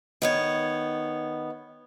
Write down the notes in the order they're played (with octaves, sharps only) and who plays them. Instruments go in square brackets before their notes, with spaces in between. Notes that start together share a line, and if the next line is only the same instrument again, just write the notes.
[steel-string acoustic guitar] D#3 B3 C#5